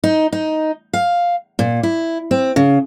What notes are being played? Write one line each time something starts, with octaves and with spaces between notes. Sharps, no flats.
D#4
D#4
F5
A#2
E4
C4
C#3